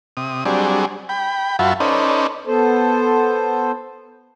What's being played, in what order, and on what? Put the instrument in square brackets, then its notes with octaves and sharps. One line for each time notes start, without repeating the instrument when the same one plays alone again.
[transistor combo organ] C3 D#6
F#3 G3 C4 D4 G#4
G5 B5
F#2 F4 F#4 E5 A5 B5
C#4 D#4 A4 B4 C5 D5
[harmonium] B3 A4 C5